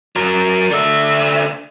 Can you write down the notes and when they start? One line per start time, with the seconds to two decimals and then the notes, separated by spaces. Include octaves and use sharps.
0.16 F#3 A#4
0.71 D3 E5